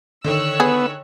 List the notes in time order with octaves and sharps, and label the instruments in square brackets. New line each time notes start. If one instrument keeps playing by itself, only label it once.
[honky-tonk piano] D3 D#3 [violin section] C#5 E6 F#6
[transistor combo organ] B3 [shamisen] G#4